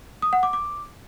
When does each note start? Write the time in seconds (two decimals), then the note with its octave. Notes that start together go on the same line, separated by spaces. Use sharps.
0.22 D#6
0.33 F#5
0.43 D6
0.53 D6